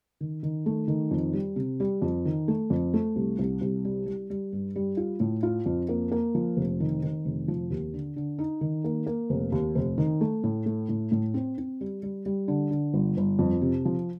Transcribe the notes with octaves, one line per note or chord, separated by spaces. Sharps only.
D#3
D#3
A3
D#3
F2
G3
C3
G3
F2
D#3
A3
F2
A3
C2
C2
C2
G3
G3
G3
G2
G3
F4
A2
F4
F2
A#3
A#3
F3
F1
D#3
D#3
F1
F3
D#2
D3
D3
D#4
D#3
A#3
A#3
F1
D#2
F1
D#3
A3
A2
A3
A2
A2
C4
C4
G3
G3
G3
D3
D3
G1
G1
F2
C3
F3